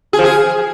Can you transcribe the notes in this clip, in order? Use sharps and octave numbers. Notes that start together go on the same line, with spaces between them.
G#4
F3
G#4